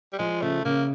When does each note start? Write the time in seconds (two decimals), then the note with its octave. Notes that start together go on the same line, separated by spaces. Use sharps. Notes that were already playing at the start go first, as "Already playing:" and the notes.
0.13 G3
0.19 F3 G#3
0.42 C#3 A3
0.65 C#3 A#3